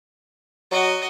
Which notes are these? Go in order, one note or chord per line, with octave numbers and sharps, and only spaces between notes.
F#3 F#4 D#5